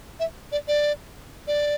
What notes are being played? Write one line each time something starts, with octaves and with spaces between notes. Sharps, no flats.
E5
D5
D5
D5